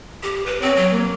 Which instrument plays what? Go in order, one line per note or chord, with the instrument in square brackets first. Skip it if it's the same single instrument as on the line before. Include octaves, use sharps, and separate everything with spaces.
[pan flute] G4
B4
[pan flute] C4 [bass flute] C#5
[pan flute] F#3
[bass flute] A#3